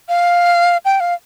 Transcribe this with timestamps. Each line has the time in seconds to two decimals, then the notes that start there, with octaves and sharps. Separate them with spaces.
0.09 F5
0.85 G5
1.00 F5